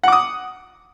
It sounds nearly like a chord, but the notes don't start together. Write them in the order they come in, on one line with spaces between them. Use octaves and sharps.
F#5 D6 D#6